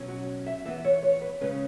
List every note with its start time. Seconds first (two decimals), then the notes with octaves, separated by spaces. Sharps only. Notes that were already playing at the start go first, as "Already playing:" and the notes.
Already playing: B2 F#3 C#4
0.08 F#4
0.46 E5
0.65 E3 B3 E5
0.84 C#5
1.03 C#5
1.22 B4
1.41 C#3 G#3 C#4 B4